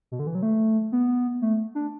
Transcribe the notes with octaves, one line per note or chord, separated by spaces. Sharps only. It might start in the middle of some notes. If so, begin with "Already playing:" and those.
B2
D3
E3
F#3
A3
B3
A3
D4